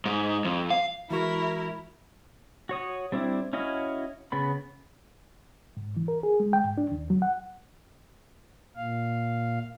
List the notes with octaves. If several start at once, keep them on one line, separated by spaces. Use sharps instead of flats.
G#2
F2
F5
E3 G#3 E4 F#4 A#4 C#6
F#4 C#5 D#6
G3 C4 D4 E4
C#4 E4 F#4 D#5 F5
C#3 B3 B5
G#2
E3
A#4
G#4
G#3
G5
G#2
D4
D#2
F#3
F#5
A#2 F5